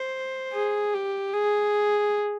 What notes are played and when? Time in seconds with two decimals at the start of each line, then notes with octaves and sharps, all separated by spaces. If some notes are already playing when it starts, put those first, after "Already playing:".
Already playing: C5
0.53 G#4
0.94 G4
1.33 G#4